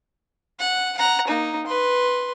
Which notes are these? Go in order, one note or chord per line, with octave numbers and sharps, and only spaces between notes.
F#5
F#5 A#5
A#3 D#4
B4 C6